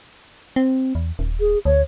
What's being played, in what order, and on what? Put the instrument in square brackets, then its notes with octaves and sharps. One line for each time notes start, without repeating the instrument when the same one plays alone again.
[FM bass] C4
E2
D#1
[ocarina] G#4
[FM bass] D2 [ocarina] C#5